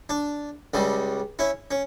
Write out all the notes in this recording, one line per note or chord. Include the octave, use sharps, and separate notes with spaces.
D4
C#2 C#3 G3
C#4 E4
C#4